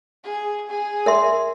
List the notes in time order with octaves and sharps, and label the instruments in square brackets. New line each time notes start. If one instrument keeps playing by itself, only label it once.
[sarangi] G#4
G#4
[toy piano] A#4 E5 C6